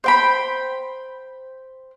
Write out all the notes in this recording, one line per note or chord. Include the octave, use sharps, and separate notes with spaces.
C5 G5 B5